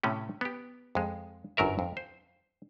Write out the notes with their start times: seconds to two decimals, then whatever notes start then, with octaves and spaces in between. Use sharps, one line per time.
0.04 A2 C3 A3 C#4
0.41 B3 G4
0.95 F2 G#3
1.57 G1 F#2 F#3 A#4 E5
1.79 F2
1.97 C5